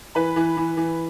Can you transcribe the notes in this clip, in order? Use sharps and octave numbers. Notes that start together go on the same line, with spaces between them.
E3 B4 B5
E3
E3
E3